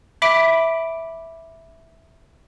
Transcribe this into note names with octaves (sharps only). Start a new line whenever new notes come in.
E5 B5 D6 B6 D7